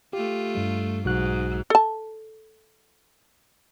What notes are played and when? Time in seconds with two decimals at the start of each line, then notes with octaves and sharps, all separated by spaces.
0.13 A3 F4 G4
0.55 G2 G3
1.05 B1 G#2 F#4 F#6
1.70 A4 A5